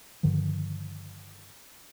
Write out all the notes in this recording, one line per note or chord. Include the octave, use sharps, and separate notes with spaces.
G2 D3 D#3 F3